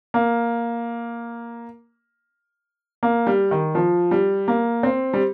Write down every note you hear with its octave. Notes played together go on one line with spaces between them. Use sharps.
A#3
A#3
G3
D#3
F3
G3
A#3
C4
G3